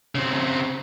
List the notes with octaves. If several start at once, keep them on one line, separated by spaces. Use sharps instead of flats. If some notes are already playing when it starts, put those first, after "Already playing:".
C#3 C4